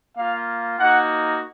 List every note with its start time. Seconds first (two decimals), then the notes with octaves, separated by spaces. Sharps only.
0.17 A#3 F4 F5
0.79 A#3 D#4 F#4 F#5